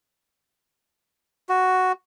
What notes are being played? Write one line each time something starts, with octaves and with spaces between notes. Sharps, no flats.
F#4